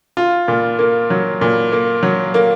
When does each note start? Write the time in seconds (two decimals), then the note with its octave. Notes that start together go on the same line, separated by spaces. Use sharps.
0.17 F4
0.48 A#2
0.79 A#3
1.10 F#3
1.41 A#2
1.72 A#3
2.03 F#3
2.34 A#3